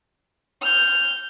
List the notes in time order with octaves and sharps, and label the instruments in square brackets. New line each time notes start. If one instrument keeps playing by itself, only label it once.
[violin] F6 G6